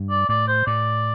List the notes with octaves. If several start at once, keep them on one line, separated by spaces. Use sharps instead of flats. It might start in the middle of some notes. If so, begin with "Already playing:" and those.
Already playing: G2
D5
A2 D5
C5
A2 D5